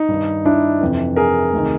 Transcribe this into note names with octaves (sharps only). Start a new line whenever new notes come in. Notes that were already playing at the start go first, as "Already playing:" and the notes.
Already playing: D#4
G2 D#3
D4 E4
F2 C3 E3
G#4 A#4
D2 C3 D#3